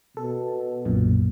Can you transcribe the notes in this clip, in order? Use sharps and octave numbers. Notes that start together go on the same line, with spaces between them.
B2 A4
B1 F#2 A#2